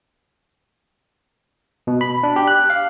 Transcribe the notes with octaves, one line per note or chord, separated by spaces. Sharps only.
B2
B5
D4
G4
F#6
F5